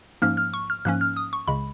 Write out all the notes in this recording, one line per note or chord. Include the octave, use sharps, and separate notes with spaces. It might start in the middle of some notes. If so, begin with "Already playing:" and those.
G#2 F3 A#3 C#4 F6
F6
C#6
F6
G#2 F3 A#3 C#4 F#6
F6
D#6
C#6
C#2 C#3 G#3 B5